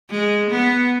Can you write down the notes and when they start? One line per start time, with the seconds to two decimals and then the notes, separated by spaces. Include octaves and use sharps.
0.10 G#3
0.50 B3